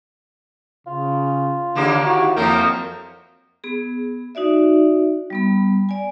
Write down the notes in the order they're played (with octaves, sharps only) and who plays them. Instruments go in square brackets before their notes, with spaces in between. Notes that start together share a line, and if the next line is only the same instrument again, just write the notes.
[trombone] C#3 [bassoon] F4
[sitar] D#2 A#3 G4 [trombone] D3
[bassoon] A2 [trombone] F#4
[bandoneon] F2 A#4 G6 [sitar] F3 F#3 C4 [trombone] A#3
[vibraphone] B3 G#4
D#4 F#4 D5 E5
G3 B3 B5
D5 G#5